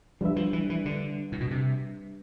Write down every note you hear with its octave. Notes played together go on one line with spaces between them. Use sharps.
F3 G3 D4 G4 B4 E5
F3
E3
E3
D3
A2
B2
C3